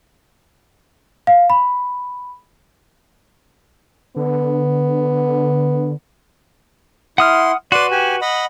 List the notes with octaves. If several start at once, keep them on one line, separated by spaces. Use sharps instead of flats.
F5
B5
D3 B3
E4 F#5 C6 D#6 F6
F#4 B4 D5 C6
G4 G#5
D#5 F#5 B5